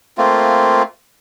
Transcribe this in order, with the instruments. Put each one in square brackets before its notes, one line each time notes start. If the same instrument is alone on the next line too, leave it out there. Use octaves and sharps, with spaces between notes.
[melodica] A3 A#3 C4 F4